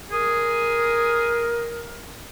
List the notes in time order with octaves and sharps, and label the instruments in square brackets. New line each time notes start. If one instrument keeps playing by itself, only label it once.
[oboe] G#4 [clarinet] A#4